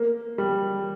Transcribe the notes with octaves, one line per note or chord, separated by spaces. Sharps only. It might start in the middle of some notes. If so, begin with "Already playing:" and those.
Already playing: A#3
G3